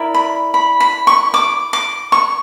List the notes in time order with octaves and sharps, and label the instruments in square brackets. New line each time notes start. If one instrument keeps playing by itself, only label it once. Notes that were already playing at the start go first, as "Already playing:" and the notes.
Already playing: [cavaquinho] E4 A#4 D5
B5
B5
B5
C#6
D6
D6
C#6